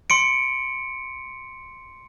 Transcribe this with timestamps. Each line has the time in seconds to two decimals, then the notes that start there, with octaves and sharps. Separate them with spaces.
0.10 C6 C#7 D7